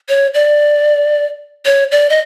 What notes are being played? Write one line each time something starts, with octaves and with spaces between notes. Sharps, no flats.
C#5
D5
C#5
D5
D#5